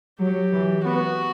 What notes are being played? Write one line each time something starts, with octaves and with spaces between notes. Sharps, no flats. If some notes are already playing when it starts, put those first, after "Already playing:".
F#3 G4
E3
B3 F#4